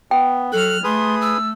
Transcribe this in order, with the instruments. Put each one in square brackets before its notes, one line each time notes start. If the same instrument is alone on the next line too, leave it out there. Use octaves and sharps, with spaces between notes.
[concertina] B3 [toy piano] G5
[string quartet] F#3 F6 [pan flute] A4 [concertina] F#6
[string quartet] A3 [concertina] G#4 B4 D#6 [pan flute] C6
[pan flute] E6